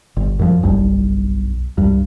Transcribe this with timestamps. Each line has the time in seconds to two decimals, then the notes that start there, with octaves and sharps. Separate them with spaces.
0.16 G1
0.39 F#2 E3 F3
0.63 F#1 B1 G2
1.78 C2 G2